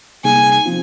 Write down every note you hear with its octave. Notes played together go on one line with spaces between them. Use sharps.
C3 G3 A#3 D#4 G#4 G#5
F3 C4 F4